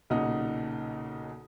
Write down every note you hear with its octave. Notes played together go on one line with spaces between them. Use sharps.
B1 A#2 C#3 D#4 F#5 D#6